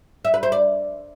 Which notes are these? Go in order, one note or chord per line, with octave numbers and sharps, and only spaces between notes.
E5
B4
C5
D5